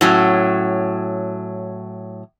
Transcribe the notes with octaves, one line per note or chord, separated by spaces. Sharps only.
A2 F#3 C#4